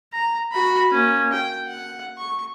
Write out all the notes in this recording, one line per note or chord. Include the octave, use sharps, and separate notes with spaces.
A#5
F#4 B5
A#3 C#4
G5
F#5
C#6